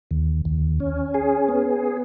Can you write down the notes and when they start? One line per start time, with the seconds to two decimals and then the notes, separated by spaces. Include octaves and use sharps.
0.11 D#2
0.45 D#2
0.80 C#4
1.14 G#4
1.48 B3